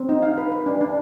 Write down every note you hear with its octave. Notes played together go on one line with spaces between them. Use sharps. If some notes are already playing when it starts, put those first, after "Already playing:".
Already playing: C4
D#4
F5
B4
B4
D4
D4